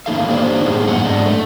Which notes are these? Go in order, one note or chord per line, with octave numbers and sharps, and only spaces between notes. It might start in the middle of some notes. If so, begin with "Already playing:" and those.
A#3 D#4 A4 F5
D4 D#4 G4 C5 C#5
A2 A#3 B3 G#4
F#2 F#5
G#2 D4 D#5
A3